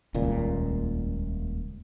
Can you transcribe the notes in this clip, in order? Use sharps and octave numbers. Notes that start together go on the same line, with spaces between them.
D#1 C#2 A#2